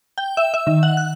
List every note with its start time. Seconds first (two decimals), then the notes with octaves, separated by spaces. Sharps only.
0.18 G5
0.37 E5
0.54 E5
0.67 D#3
0.83 F#5
0.97 F#6